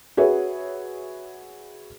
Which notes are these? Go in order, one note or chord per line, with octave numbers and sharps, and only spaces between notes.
F#4 G#4 B4 C#5 E5